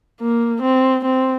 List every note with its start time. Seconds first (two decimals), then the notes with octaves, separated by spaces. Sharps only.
0.21 A#3
0.62 C4
1.05 C4